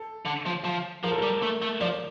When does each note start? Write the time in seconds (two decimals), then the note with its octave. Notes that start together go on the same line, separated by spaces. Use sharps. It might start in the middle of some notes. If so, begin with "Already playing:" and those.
Already playing: A4
0.25 D3
0.46 F3
0.64 F3
1.04 F3 A#4
1.11 A4
1.18 G3 A#4
1.43 A3
1.62 A3
1.81 F3 D5